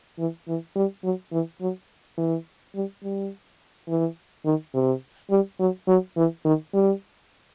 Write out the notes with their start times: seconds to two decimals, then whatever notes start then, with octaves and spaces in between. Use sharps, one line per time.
0.19 E3
0.48 E3
0.76 G3
1.04 F#3
1.32 E3
1.61 F#3
2.18 E3
2.75 G3
3.03 G3
3.88 E3
4.45 D#3
4.74 C3
5.30 G3
5.59 F#3
5.88 F#3
6.17 E3
6.45 D#3
6.74 G3